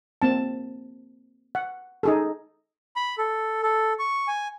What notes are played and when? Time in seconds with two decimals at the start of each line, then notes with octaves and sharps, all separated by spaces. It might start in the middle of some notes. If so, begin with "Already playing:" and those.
0.22 A#3 C4 A5
1.55 F#5
2.03 D#4 G#4 A4
2.96 B5
3.18 A4
3.62 A4
3.99 C#6
4.28 G#5